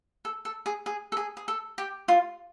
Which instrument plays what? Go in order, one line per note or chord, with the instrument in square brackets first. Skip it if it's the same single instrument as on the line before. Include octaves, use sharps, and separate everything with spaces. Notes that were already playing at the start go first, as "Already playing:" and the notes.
[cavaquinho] A4
A4
G#4
G#4
A4
G#4
G#4
A4
G4
F4